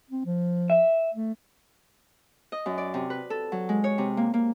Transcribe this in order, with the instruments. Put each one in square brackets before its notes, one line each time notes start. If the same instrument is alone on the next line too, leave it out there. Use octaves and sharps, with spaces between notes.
[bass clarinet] C4
F3
[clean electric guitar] E5
[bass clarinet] A3
[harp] D#5
F#2
D5
C3
B4
A4
F#3
G#3
C#5
C3
A#3
A#3